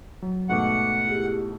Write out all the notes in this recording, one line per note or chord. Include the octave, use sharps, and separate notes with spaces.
F#3
G#2 B2 A3 F#5 C#6 D6
E4 G4 G#4